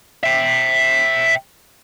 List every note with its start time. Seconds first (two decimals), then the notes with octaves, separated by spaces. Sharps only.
0.24 E5 G5